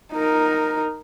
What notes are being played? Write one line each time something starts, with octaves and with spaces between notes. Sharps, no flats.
D#4 A#4